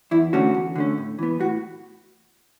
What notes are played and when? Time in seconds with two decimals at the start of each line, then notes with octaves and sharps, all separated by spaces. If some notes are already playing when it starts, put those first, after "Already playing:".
0.11 E2 E4
0.33 D3 A3 C#4 F#4
0.54 E2
0.75 D3 A3 C#4
0.98 A2
1.19 E3 B3
1.39 A2 F#4